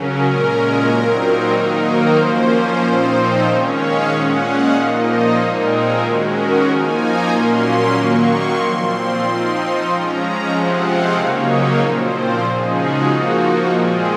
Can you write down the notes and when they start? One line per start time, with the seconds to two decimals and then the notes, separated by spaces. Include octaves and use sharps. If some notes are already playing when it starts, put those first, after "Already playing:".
Already playing: C#3 F#3 C#4 A#4
0.23 A#2 G#3 C#4
0.88 A#2 F#3 C4 D#4
1.52 D#3 F#3 A#3 D#4 A#4
1.84 C5
2.16 F3 A#3 C#4
2.80 A#2 F3 C4 D#4
3.45 D#3 G#3 C#4 C#5
3.77 F5
4.08 A#2 G#3 C#4 F#5
4.40 F5
4.72 A#2 F3 A#3 D#4 D#5
5.04 C5
5.37 A#2 G#3 C4 D#4 A#4
5.69 G#4
6.00 D#3 G#3 C#4 F#4
6.33 A#4
6.65 F3 A#3 D#4 G#5
6.97 A#5
7.28 A#2 F#3 A#3 C#4 C6
7.93 D#3 F#3 A#3 C#6
8.25 C6
8.57 A#2 F3 C4 C6
9.21 F3 C4 D#4
9.85 F3 G#3 C#4 A#5
10.49 C3 F3 G#3 C4 F#5
10.81 F5
11.13 C#3 F#3 A#3 D#4 C#5
11.45 C#5
11.77 A#2 F3 C4 C5
12.42 C#3 F3 G#3 D#4 G#4
12.73 F#4
13.05 F3 A#3 D#4
13.70 A#2 F3 G#3 C4 G#4